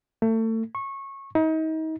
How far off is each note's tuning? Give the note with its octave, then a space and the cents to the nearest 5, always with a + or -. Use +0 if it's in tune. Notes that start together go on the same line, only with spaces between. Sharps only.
A3 +30
C#6 -20
D#4 +35